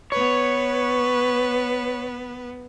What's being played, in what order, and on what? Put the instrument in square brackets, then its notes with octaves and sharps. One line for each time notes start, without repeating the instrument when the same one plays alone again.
[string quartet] B3 B4 [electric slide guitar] C#5